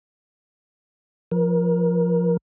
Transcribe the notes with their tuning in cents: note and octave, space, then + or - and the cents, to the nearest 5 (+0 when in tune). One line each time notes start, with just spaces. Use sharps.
F3 +0 A#4 +30